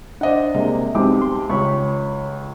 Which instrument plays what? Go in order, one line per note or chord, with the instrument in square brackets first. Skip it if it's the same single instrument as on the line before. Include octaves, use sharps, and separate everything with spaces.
[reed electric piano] D4 D5 [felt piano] C5 D#5 F#5
[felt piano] C3 G#3 A#3
[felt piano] B1 G4 D6 [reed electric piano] G#3 C4
[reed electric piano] C6
[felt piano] C#2 [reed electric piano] C#5 B5 C#6